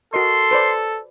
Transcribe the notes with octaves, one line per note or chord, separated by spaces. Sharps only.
F#4 A4 A#4 D#5 C6
B4 C5 D5